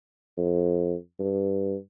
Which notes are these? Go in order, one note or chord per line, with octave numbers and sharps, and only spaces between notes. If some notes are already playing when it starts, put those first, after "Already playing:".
F2
G2